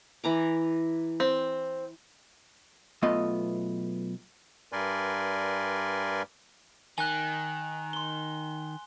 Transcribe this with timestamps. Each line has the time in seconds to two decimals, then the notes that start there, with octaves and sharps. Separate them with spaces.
0.24 E3 A#5 D6
1.20 C4
3.02 B1 A3 B3 F4 D#5
4.72 G2 A#4 B4 D5 G#5 C6
6.98 D#3 G#5 F#6
7.93 C6 G7